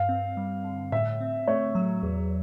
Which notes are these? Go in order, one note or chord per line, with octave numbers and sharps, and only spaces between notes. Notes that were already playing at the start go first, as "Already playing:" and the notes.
Already playing: G2 F5
C4
G3
D3
A2 E5
C4
A3 C#5
F#3
E2